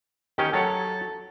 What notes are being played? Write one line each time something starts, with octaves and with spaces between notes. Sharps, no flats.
D#3 C#4 G4 C#5
F#3 A4 C#5 F#5